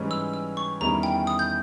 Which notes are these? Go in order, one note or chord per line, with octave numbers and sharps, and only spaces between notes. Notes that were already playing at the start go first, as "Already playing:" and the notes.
Already playing: G#2 E3 G3 C#4
E6
E6
C#6
E2 D#3 G3 C#4 E4 A#5
G5
D#6
G6